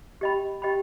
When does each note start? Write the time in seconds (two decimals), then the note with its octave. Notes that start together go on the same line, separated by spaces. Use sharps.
0.21 G4 D#5 G5 B5
0.62 G4 D#5 G5 B5